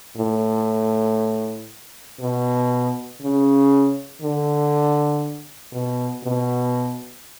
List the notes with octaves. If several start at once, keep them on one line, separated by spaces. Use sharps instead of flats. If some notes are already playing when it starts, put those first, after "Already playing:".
A2
B2
C#3
D3
B2
B2